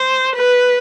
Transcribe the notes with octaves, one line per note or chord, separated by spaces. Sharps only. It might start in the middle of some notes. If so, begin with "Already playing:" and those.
Already playing: C5
B4